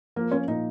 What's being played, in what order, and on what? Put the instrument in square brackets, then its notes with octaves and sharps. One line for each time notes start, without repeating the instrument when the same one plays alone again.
[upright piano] F3 [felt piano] A#3
[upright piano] A#3 [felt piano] C#4
[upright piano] A#2 [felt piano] D#4